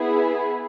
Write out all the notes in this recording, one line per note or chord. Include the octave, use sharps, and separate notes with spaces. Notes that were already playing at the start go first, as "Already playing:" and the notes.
Already playing: B3 E4 G#4